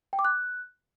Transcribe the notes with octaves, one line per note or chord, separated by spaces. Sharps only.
G5
D6
F#6